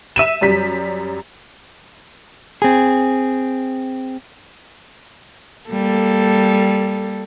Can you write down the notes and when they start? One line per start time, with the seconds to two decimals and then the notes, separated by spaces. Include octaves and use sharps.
0.16 E5 D#7 E7
0.41 F#2 G3 B6
2.62 C4 G#4
5.70 G3 A#3 A4